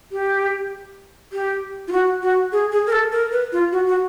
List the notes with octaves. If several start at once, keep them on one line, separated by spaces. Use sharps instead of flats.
G4
G4
F4
F#4
F#4
G#4
G#4
A#4
A4
A#4
B4
F4
F#4
F#4